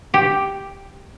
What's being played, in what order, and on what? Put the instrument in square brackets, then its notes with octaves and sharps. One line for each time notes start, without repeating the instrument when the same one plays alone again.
[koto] G4